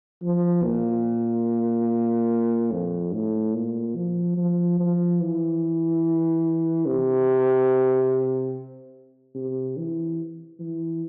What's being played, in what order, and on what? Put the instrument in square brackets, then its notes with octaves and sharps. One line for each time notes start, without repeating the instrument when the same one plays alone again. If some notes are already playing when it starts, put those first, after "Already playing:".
[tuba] F3
A#2
F2
A2
A#2
F3
F3
F3
E3
C3
C3
E3
E3